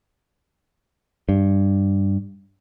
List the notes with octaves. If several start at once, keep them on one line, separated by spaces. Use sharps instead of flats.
G2